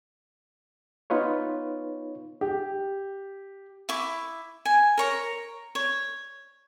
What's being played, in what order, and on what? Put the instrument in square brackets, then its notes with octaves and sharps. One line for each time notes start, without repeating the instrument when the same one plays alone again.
[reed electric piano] B3 D#4 F4 B4 C#5
[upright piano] G4
[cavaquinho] E4 C#6 D6
G#5
A#4 C#5 A#5
C#5